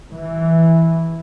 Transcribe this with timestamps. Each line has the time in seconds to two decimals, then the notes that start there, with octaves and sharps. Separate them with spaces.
0.12 E3